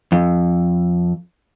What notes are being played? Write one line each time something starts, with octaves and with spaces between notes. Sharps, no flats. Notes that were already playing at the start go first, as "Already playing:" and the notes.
F2